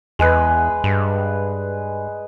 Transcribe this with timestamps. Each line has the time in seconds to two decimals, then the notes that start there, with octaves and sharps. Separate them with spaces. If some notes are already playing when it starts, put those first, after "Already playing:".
0.19 E2 G#3 G#4 B4
0.84 G2